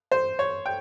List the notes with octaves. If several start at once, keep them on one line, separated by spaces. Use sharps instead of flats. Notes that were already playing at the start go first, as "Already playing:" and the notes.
C5
C#5
G5